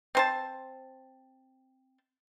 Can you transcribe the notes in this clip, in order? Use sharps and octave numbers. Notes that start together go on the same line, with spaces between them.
C4 C5 A5